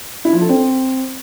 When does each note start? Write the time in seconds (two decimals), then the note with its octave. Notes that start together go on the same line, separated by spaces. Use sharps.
0.25 E4
0.33 F3
0.41 A4
0.49 C4